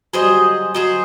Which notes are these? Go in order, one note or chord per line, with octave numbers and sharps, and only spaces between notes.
F#3 G#4 C5 D#5
G3
F#3
F#3 G#4 C5 D#5